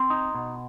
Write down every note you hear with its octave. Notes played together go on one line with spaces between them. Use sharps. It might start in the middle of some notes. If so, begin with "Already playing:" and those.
Already playing: C4 C6
D#4
B2